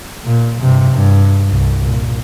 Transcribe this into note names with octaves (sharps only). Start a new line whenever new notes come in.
A#2
G2 C3
G2
C2
A#2